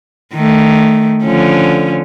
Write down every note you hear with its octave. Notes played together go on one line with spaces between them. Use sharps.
D#3 A3
D3 F3 C#4